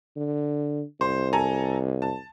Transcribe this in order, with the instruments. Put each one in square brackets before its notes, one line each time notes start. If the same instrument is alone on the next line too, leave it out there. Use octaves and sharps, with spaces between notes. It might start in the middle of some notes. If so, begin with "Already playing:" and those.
[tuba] D3
[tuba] C2 [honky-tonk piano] C5
[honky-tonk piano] A4 G#5 A#5
A5